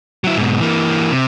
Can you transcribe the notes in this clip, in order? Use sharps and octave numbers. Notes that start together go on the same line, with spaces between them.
F#3 E4
G#2 B2
E3 A#3
C3